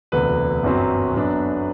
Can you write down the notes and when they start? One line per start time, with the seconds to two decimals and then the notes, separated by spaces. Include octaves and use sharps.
0.12 E1 D2 C3 B4
0.63 G1 F#2 F#3 C4
1.14 F#2 F#3 B3 D4